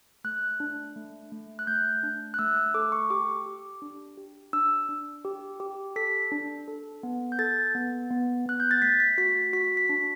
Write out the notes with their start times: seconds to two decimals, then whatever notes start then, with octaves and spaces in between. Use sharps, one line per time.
0.24 A3 F#6
0.60 D4
0.96 A3
1.32 A3
1.59 F#6
1.67 A3 G6
2.03 D4
2.34 F#6
2.39 A3 E6
2.57 E6
2.74 A4 D6
2.92 C#6
3.10 G4 D6
3.46 G4
3.82 D4
4.17 G4
4.53 D4 E6
4.89 D4
5.25 G4
5.60 G4
5.96 A4 B6
6.32 D4
6.68 A4
7.03 B3
7.32 G6
7.39 A4 A6
7.75 B3
8.11 B3
8.46 B3 F#6
8.60 G6
8.71 A6
8.82 A3 B6
9.00 B6
9.18 F#4 B6
9.53 F#4 B6
9.77 B6
9.89 D4